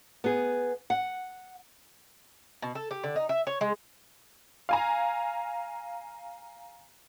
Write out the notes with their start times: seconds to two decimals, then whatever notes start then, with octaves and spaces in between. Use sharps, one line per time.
0.24 B3 G#4
0.90 F#5
2.62 B2
2.75 A4
2.91 G4
3.03 D3
3.16 D#4
3.29 E5
3.47 C#5
3.61 G#3
4.69 F5 G#5 A#5